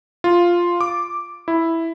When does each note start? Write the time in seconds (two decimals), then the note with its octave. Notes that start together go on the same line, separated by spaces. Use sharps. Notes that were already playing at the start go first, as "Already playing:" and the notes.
0.24 F4
0.81 D6
1.48 E4